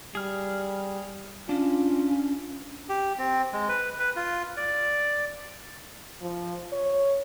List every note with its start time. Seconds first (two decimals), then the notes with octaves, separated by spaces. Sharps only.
0.15 G3 G#4 F6
1.49 C#4 D4 F4
2.89 G4
3.18 C4
3.53 G#3
3.69 B4
3.99 B4
4.16 F4
4.57 D5
6.22 F3
6.72 C#5